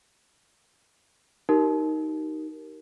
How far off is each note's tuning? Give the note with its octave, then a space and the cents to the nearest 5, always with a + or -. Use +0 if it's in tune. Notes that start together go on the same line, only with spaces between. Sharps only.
D#4 +5 G4 -35 A#4 +0